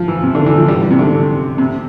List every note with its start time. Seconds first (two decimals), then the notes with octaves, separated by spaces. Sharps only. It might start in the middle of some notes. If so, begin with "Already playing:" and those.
Already playing: F3
0.08 E3
0.23 C3
0.35 D3
0.46 E3
0.58 F3
0.68 G3
0.91 C3
0.99 D3
1.58 C3